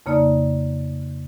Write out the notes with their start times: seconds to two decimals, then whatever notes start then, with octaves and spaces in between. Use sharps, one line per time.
0.06 F2 C#3 A#3 D#4 D5